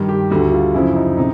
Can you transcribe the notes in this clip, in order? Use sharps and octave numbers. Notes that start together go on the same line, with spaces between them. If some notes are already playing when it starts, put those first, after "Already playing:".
Already playing: G2 D#3 G3
G4
D2 D3 G3 F#4
F4
F#2 C#3 F3 E4
D#4
C3 D#4